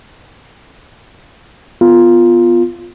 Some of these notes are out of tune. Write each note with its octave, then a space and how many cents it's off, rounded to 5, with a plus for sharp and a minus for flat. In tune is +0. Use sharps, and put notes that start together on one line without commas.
B3 +0 F4 +0